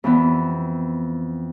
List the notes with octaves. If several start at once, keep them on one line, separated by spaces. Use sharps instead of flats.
F2 E3 B3